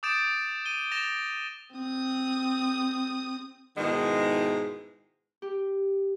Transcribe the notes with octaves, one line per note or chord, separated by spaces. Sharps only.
D6 D#6 G6 A6 D7 E7
D#7 G7
A6 A#6 D7 E7 F7 G7
C4 D#6
G#2 B2 D#3 G#3 E4
G4